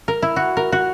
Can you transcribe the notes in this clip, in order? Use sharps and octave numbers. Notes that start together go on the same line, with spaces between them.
A#4
E4
F#4
A#4
F#4